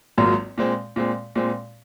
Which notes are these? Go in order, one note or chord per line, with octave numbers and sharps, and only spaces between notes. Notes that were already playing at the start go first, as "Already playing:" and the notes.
G#1 G#2 F#3 A#3 F4
A#2 G#3 C4
A#2 G#3 C4
A#2 G#3 C4